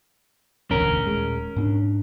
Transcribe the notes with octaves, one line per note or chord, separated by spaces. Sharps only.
E1 A1 D2 C#4 A#4
D#1 C#2 G#3
G#2 C4 D4